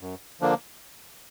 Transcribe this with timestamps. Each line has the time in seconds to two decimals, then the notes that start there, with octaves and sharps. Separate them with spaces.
0.01 F#2
0.40 D3 F3 A#3 D4